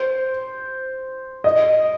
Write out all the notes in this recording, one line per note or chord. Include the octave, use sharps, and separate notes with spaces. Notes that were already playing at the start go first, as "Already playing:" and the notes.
Already playing: C5
D#5